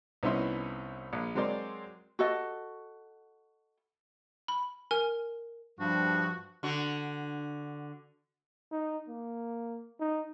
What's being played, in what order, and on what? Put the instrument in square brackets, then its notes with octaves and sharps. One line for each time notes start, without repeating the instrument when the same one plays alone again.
[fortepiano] C2 B3 C#4 D#4 E4 C6
A#1
F#3 G#3 C4 A#4 D5 C6
[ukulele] F#4 A4 D#5
[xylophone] B5
A#4 G#5 F6
[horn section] G2 F3 [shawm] F#4
[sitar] D3 F#4
[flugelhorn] D#4
A#3
D#4